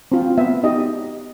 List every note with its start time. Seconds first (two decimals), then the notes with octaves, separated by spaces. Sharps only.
0.12 C4 F4
0.38 B3 E5
0.64 D#4 G4 D#5